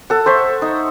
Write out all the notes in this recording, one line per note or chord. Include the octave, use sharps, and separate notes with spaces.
A4 F#5
C5 E5 C#6
D#4